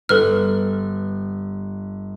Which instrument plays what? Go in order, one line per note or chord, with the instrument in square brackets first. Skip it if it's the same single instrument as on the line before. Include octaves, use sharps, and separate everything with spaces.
[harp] G1 [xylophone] A4 B4 F6